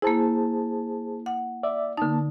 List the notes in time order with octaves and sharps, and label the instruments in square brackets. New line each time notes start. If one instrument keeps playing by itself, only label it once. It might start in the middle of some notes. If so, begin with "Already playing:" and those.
[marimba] A#3 E4 [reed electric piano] G#4 C5 A5
[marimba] F#5
[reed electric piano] D5 E5
[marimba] D3 D#4 [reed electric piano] A#3 A5